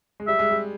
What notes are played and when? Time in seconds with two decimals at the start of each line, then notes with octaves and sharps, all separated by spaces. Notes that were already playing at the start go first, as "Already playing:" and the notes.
0.20 G#3
0.28 G3 E5
0.39 G#3
0.51 G3